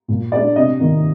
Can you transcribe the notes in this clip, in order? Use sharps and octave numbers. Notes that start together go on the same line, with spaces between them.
A#2
G#3 D4 D5
C3 D#5
D#3 A#3